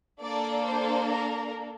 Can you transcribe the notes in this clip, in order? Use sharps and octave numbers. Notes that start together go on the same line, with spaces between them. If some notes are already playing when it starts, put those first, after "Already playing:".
A#3 D4 A4 D5
C5
A#4